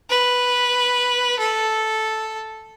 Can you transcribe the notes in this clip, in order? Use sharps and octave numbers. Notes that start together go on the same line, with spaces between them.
B4
A4